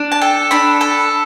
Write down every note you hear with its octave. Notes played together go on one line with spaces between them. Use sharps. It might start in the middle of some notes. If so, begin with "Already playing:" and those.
Already playing: D4
A5
A4 G5
D4 B5
A4